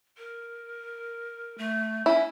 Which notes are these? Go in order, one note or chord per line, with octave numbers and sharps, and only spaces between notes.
A#4
A3
C#4 E4